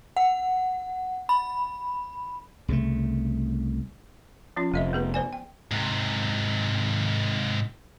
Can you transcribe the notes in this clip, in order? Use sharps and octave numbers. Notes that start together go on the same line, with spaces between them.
F#5
B5
C2 C#3 F#3 A3
F3 C#4 F4
F1 A3 D#5 E5
B3 G#4 B4
C5 D5 G#5
G5
G#2 C3